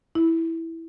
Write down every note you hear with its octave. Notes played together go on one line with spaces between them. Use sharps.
E4